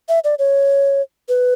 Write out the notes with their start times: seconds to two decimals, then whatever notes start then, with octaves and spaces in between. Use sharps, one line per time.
0.09 E5
0.24 D5
0.39 C#5
1.29 B4